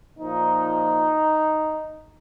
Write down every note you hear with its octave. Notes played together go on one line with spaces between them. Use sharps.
A#2 F3 D#4